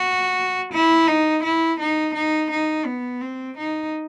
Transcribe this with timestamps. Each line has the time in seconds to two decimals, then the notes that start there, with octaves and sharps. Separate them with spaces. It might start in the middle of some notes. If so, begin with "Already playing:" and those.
Already playing: F#4
0.73 E4
1.07 D#4
1.43 E4
1.79 D#4
2.14 D#4
2.50 D#4
2.86 B3
3.21 C4
3.57 D#4